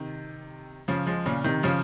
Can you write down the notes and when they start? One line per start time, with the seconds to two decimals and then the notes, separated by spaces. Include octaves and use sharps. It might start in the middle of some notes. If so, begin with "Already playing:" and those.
Already playing: C3 D#3
0.88 C#3 F3
1.06 F3 G#3
1.26 A#2 C#3
1.44 C3 D#3
1.63 C#3 F3